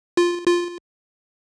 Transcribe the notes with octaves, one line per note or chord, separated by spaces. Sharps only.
F4
F4